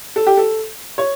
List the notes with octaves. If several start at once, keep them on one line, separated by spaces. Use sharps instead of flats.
A4
G4
A4
C#5